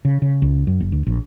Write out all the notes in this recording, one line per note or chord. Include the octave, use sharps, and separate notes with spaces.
C#3
C#3
C#2
F#2
F#1
D2
A#1